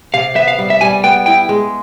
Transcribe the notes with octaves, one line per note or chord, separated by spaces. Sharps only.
C3 F5
B3 E5
F5
G3
E5
G3 G#5
B3 G5
E4 G5
G#3